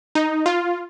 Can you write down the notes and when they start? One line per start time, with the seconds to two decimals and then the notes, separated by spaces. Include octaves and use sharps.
0.15 D#4
0.46 F4